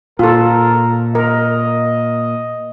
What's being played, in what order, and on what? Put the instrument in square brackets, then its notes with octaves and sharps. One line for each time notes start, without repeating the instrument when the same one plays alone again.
[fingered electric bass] A#2 [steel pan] F4 A4 [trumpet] A#4
[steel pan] A#4 [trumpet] D#5